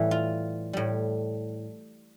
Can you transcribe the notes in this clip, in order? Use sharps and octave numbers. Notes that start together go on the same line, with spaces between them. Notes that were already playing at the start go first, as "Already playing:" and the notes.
Already playing: A2 E3 G3 A4
F4
A2 G3